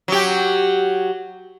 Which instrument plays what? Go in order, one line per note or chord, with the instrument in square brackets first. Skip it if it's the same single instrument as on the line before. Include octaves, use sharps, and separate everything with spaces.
[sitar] F#3 G4